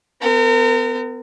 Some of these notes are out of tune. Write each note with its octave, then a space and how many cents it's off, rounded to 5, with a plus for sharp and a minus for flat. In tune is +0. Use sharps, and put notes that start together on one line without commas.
B3 +35 A#4 -35